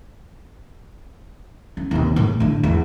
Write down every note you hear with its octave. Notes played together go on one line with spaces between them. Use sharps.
C#4
D#2 C3
A2
A2 D3
E2